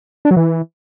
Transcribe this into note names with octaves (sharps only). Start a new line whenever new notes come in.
D4
F#3
E3